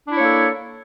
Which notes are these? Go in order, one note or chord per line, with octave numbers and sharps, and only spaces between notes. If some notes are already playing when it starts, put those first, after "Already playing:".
A#3 D4 E4 A4 C#5